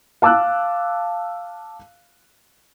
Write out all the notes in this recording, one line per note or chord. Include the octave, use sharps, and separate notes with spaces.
F5 A5 D6 E6 F#6